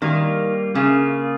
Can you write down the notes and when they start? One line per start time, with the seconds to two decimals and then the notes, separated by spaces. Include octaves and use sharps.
0.02 D#3 G3 A#3 F4
0.75 C#3 A#3 F4 G#4